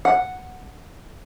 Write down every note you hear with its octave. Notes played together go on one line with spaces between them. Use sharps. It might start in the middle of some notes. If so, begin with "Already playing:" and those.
F#5